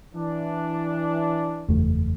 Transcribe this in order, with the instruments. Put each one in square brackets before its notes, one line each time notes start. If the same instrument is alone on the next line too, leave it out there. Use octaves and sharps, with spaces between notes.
[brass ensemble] E3 D4
[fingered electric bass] F#1 E2 A3